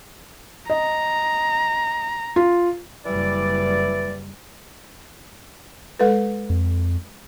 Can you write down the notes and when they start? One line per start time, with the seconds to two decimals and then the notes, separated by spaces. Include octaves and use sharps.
0.70 D#5 A#5
2.36 F4
3.06 F#1 E3 G3 D5
6.00 G#3 A4 B4
6.50 F2